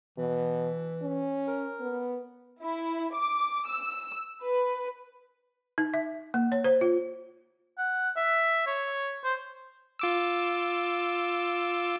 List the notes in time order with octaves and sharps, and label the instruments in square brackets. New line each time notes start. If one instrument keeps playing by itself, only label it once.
[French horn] B2 [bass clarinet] E3
[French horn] C#4
[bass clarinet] A#4
[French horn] B3
[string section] E4
D6
E6
B4
[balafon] D#4
E5
A#3
C#5
C5
F4
[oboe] F#5
E5
C#5
C5
[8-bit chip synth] F4 D6 E6